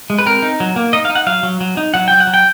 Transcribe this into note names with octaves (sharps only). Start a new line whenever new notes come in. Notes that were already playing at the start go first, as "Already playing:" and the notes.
G#3
B4
C4 A#4
D#4
F#3
A#3
D#4 D#5
F5
D#4
F#5
F#3 F5
F#3
F#3
D#4
F#3 F#5
F#3 G5
F#5
F#3
G5